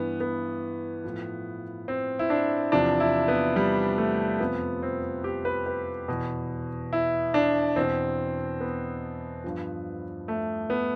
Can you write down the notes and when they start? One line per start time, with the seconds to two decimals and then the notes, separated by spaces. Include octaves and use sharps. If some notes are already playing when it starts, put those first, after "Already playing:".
Already playing: G2 E3 B3
0.20 B3
1.04 A2 F3
1.88 C4
2.19 E4
2.30 D4
2.72 E2 C3 F3 D4
3.00 E4
3.28 B3
3.56 G3
3.98 A3
4.40 F2 C3 F3 B3
4.83 C4
5.24 G4
5.45 B4
5.66 B4
6.08 E2 B2
6.93 E4
7.34 D4
7.76 E2 B2 C4
8.61 B3
9.44 G2 F3
10.28 A3
10.70 B3